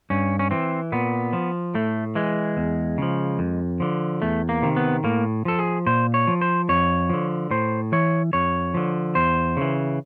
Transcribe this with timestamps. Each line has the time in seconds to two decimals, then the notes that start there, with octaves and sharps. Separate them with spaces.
0.10 G2 C#4
0.39 C#4
0.51 E3 C4
0.92 A#2 B3
1.33 F3
1.75 A2 A3
2.15 E3 G#3
2.57 E2
2.98 C#3 F3
3.39 F2
3.80 D3 F3
4.22 E2 A3
4.49 A#3
4.62 C3 D#3
4.77 B3
5.04 A2 A#3
5.45 F3 A4
5.59 G#4
5.86 A#2 C5
6.14 C#5
6.27 F3
6.41 C5
6.69 F2 C#5
7.10 D3 F3
7.51 A2 C5
7.92 E3 C#5
8.33 F2 C#5
8.74 D3 F3
9.15 E2 C5
9.57 C#3 E3